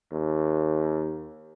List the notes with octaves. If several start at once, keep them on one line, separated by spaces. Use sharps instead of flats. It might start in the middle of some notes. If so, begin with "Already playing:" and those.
D#2